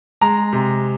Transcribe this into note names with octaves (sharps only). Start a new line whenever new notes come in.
G#3 A#5
C3